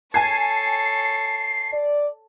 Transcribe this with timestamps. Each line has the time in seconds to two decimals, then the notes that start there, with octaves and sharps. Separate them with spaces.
0.14 A4 C#5 G#5 A5 G#6 C7
1.73 D5